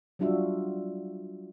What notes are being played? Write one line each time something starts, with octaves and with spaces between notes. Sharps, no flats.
F#3 G3 D4 F4 F#4 E5